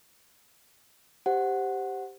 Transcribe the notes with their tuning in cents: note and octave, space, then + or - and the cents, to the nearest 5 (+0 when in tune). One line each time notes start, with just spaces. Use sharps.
G4 +0 C5 +0 F#5 +0